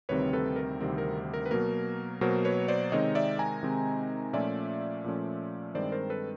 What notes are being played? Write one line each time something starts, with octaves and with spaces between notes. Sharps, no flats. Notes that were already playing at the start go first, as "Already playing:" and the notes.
D2 C3 D#3 G3 C4 B4 C#5
A4 B4
A#4
D2 C3 D#3 G3 C4
A#4
A#4
B4
B2 F#3 A#3 A#4
B2 F#3 A#3 A#4 C5
B4 C#5
C5 D5
C3 D#3 G#3 C4 D#4 C#5 D#5
D5 E5
G#5 A#5
C3 D#3 G#3 C4 D#4
A#2 F3 A3 C#4 D5 E5
A#2 F3 A3 C#4
G2 D#3 G#3 C4 C5 D5
A#4 C5
A4 B4